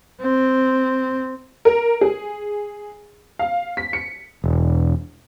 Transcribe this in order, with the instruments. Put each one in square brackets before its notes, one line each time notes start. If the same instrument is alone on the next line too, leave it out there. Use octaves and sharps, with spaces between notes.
[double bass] C4
[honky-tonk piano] A#4
G#4
F5
B6
C#7
[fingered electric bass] E1